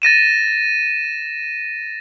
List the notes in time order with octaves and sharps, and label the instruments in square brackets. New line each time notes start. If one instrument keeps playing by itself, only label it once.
[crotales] A6 A#6 D#7 E7